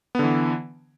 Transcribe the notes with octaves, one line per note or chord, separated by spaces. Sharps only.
D3 E3 B3